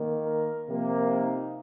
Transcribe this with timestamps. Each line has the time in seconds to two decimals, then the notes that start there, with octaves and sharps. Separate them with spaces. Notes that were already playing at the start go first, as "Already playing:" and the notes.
Already playing: D#3 A#3
0.23 A#4
0.67 C3 F3 A#3
1.11 D#4